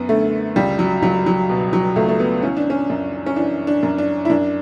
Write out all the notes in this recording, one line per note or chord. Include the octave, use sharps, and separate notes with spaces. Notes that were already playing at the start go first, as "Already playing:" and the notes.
Already playing: F#2 B3
D3 A3
C#2 G3
F#3
C#2 F#3
F#3
B2
F#3
C#2 A3
A3
B3
E3 C#4
D4
C#4
F#2
C#4
E3 D4
D4
F#2
D4
E4
F#2 D4